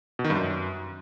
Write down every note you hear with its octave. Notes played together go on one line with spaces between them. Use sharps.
B2
D#3
G2
F#2